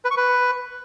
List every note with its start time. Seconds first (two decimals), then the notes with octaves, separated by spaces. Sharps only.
0.05 B4
0.11 C#6
0.17 B4